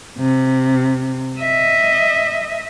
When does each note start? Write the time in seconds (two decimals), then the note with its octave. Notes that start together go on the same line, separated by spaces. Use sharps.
0.19 C3
1.39 D#5 E5